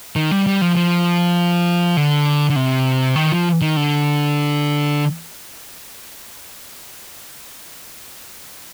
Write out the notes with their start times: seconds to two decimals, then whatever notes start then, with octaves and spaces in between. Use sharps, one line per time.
0.16 D#3
0.31 G3
0.47 G3
0.61 F3
0.76 F3
1.97 D3
2.50 D3
2.56 C3
3.16 D#3
3.32 F3
3.62 D#3
3.76 D3